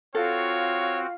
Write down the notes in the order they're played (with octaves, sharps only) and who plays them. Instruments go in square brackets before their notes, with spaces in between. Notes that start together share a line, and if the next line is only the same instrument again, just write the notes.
[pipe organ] C4 F#4 [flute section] F4 F5 F6 [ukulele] A4 [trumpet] C#5